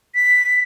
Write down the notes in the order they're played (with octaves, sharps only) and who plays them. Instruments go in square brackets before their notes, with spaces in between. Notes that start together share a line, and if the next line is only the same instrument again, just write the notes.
[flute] B6